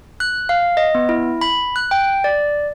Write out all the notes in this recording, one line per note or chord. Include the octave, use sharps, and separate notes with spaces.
F#6
F5
D#5
B3
E4
B5
F#6
G5
D5